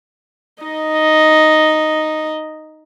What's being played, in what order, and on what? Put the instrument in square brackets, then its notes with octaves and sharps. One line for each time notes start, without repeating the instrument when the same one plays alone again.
[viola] D#4 D#5